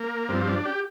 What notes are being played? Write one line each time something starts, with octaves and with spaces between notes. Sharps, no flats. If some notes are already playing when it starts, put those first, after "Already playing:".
Already playing: A#3
G2 F3 C4
D4
G4